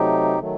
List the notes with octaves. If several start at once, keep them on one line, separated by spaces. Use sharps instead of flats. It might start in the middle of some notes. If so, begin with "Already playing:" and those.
Already playing: C3 F#3 A3 D#4 G4
D#3 F#3 A3